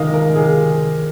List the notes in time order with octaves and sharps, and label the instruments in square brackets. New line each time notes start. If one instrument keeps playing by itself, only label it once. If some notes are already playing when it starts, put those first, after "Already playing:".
Already playing: [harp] C3 D#3 [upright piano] D#4 D#5 F5
[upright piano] A#4
[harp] C3 [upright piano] G#4